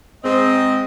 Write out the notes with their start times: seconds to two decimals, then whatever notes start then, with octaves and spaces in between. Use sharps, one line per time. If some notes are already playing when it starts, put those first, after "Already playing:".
0.24 G#2 C4 D#5